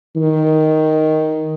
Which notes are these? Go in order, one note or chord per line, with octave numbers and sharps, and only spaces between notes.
D#3